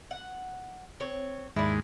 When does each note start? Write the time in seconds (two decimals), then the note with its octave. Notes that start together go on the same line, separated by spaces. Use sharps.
0.11 F#5
1.00 C4 C#5
1.56 D#2 G#2 G#3 D4 E4